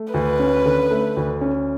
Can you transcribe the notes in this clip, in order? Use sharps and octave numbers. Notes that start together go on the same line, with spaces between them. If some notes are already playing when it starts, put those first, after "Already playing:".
Already playing: A3
D2 B4
C#4
D3
A3
D2
C#4